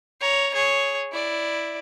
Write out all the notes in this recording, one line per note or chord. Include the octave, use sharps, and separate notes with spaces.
C#5 A#5
G#4 C#5
E4 D5